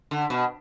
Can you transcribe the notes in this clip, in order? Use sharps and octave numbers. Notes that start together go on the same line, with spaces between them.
D3
B2